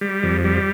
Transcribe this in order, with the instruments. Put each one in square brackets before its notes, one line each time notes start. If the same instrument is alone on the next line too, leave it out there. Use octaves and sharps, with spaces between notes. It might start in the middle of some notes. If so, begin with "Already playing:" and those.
[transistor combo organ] G3
F2
G3